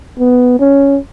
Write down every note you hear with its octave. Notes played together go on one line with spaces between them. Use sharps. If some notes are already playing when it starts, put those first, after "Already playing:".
B3
C#4